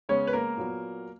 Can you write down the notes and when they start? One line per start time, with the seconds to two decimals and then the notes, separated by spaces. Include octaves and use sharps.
0.09 C#3 G#3 B3 C#4 C#5
0.27 B4
0.33 A#3 A#4
0.57 A#2 F#3 B3